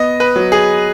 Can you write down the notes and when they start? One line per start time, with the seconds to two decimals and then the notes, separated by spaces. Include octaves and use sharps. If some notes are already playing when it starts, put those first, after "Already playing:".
Already playing: B3 D#5
0.20 B4
0.36 F#3
0.52 G#4